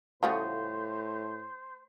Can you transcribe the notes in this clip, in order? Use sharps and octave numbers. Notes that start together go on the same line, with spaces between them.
A2 C#3 F3 G3 A3 F#4 G#4 C5